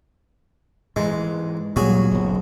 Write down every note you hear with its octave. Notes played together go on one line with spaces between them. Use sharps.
G#2 E3 G#3
D2 A#2 F#3 G3 F#4 G#4
F#1 B1